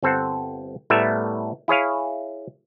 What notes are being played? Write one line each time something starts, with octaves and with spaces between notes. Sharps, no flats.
G1 C4 A4 C5 F#5
A2 G3 A3 B3 A#4 E5
E4 G#4 C#5 F5